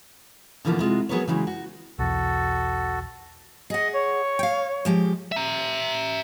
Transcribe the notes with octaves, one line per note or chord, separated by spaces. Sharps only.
B2 D3 E3 F3 A#3 B3
C3 G#3 F4 F#4
F#3 B3 G#4 A#4 B4 C#5
C#3 E3 F#3 G#3
F#4
B1 E2 F#4 A4
G#4 D#5 F#5
C#5
F5 G5
F3 G#3 G4
E5 A#5